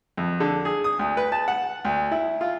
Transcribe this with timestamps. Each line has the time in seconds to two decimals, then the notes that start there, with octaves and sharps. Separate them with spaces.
0.17 F2
0.40 D3
0.65 G#4
0.84 D#6
0.99 D2
1.17 B4
1.32 A5
1.48 F#5
1.85 D2
2.11 E4
2.41 F4